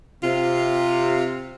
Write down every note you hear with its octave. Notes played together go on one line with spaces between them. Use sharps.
C3 F4